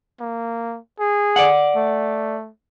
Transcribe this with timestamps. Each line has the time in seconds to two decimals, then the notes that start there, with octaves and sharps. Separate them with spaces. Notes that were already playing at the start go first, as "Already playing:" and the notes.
0.20 A#3
0.99 G#4
1.36 D5 F#5
1.76 A3